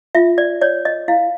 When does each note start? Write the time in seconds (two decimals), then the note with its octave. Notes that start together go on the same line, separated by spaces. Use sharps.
0.15 F4 E5
0.38 D5
0.61 C#5 D5
0.85 D#5
1.08 E4 F5